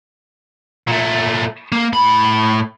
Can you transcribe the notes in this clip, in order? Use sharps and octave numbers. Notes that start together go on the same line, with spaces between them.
A#2 A3
A#3
A2 B5